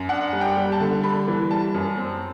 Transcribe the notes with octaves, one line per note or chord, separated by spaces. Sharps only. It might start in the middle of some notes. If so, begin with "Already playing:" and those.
Already playing: F#2
D4 F#5
G3
G5
G3
A5
D3
G3 B5
E3
G3 A5
F#2
C4